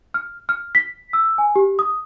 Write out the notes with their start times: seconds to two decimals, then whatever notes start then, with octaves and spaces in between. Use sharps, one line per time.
0.14 F6
0.49 F6
0.75 B6
1.13 E6
1.38 G#5
1.56 G4
1.79 D#6